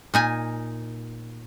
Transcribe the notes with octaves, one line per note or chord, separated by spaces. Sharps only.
A#2 D#4 G#5